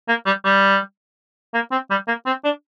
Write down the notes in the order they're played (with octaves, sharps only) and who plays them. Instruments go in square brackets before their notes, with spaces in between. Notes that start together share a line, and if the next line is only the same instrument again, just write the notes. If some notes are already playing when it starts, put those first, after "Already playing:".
[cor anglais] A#3
G3
G3
A#3
C4
G3
A#3
C4
D4